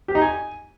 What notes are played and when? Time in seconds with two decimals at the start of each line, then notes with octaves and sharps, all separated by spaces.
0.08 G4
0.15 D#4
0.22 G#5